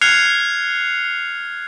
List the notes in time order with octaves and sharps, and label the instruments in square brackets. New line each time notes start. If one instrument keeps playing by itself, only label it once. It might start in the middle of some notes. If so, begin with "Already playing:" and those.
[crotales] F6 F#6 G#6 C7 C#7 F7